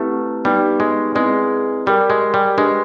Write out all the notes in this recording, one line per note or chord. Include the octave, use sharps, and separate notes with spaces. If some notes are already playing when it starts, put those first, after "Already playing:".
Already playing: A3 C4 E4 G4 B4
G3 B3 D#4 G4 B4
G#3
G#3 C4 E4 G#4 B4 D5
G3 G4 A#4 D5
G#3
G3
G#3 D4 G4 B4